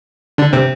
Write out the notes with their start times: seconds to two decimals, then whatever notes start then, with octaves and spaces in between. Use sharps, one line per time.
0.38 D3 D4
0.53 C3 C4